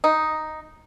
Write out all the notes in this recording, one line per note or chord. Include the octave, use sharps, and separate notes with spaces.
D#4